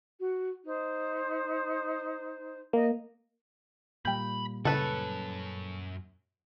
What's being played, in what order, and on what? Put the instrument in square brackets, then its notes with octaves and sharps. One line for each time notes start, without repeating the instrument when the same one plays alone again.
[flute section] F#4
D#4 C5
[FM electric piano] A#3 [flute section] D#5
[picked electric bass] A#2 G3 [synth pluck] G5 G6 [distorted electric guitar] B5
[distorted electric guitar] F#2 C#5 [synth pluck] C#3 A5 [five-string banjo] A4 B4